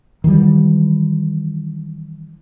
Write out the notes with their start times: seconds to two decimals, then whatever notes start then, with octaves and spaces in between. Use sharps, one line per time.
0.24 D#3 E3 F#3 G3